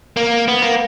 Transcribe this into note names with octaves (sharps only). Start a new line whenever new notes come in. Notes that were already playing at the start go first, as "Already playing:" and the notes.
A#3
B3
A#3